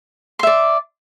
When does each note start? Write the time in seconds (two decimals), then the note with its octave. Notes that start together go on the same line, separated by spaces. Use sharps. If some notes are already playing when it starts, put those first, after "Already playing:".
0.39 C6
0.43 E5
0.47 D5